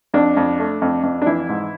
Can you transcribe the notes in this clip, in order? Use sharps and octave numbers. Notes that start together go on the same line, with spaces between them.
F2 D4
F2
A3
F2
F2
D4
E3 E4
G#2